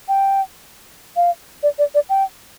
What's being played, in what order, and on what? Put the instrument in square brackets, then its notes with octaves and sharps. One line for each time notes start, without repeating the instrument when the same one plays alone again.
[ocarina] G5
F5
D5
D5
D5
G5